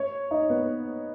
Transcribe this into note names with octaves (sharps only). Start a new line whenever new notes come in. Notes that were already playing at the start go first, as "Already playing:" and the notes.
Already playing: C#5
D#4
B3